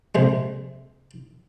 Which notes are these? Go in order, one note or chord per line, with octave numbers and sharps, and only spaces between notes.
A#1 C3 G#3